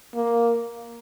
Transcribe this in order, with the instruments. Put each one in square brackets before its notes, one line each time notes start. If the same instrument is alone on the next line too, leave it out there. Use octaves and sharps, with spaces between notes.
[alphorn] A#3